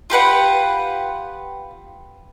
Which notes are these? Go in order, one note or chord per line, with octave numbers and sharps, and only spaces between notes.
F4 G4 B4 F#5